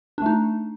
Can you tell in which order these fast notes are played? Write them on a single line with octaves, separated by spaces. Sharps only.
D4 A3 D#4